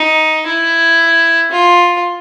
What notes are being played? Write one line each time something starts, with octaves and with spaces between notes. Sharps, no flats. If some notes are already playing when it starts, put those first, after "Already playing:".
Already playing: D#4
E4
F4